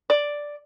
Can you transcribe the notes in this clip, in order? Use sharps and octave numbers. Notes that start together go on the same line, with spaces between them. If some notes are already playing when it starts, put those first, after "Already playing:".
D5